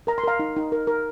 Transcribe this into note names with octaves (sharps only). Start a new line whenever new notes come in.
A#4 A#5
C6
A#4 F5 A#5
D#4
D#4
A#4
A#4